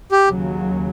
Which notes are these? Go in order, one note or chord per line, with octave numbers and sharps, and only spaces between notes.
G4
D#2 C#3 F#3